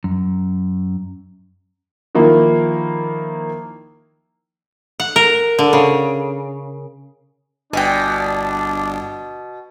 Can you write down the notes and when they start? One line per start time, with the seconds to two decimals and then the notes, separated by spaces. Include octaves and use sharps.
0.04 F#2
2.15 D#3 F3 A#3 E4
5.00 F#5
5.16 A#4
5.59 D3
5.73 C#3
7.73 G1 B2 D4 G5 G#5